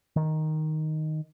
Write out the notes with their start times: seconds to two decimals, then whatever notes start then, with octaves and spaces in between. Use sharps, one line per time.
0.16 D#3